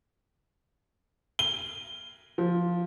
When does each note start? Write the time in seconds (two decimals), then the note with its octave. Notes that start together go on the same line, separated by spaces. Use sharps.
1.39 G7
2.38 F3